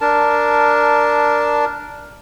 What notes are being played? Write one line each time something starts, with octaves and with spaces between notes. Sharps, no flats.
D4 A#4 A5